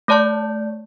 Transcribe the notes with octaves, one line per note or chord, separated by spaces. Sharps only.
A3 C#5 D5 A5 C#6 G6